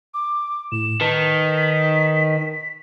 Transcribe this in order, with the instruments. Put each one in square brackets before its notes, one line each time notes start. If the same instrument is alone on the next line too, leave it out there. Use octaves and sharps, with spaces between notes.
[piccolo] D6
[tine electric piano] A2 [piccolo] E7
[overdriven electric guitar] D#3 [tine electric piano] A#4 B4 A5 [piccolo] B6